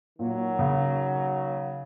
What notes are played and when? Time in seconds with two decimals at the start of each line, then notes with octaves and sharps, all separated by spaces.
0.19 A#2 D#3 F#3 A#3 F#4
0.59 C#3